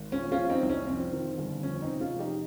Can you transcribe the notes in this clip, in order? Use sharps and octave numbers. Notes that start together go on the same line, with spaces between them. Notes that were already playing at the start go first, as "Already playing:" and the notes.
Already playing: G#1
A#2 C#4
C#4 F4
F3
C4 D#4
C2
C#4
F2 C4
D#3
G1
F2 C#4
C4 D#4
C3
C#4 F4
F1
D#4 G4